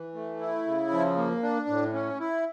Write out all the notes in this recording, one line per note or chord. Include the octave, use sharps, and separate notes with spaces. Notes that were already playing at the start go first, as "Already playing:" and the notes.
Already playing: E3
A3
E4
C#3
F3
A#3
D4
A2
C#4
E4